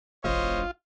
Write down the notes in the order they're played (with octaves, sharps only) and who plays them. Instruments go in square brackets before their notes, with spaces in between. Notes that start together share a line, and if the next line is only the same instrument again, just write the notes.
[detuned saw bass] E1 [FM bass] A1 [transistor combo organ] F4 [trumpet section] C5 C#5 D#5